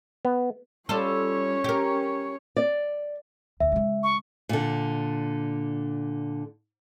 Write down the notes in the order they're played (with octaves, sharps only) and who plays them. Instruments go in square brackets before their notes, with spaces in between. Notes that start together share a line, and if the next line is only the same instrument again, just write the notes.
[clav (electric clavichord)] B3
[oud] G3 F4 A4 [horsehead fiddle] C#4 C#5
[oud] G4 A#4
[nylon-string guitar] D5
[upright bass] D2 [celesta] E5
[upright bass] C#3 G#3
[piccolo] C#6
[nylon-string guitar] A#2 D3